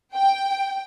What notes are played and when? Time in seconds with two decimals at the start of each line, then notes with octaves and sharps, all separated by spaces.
0.13 G5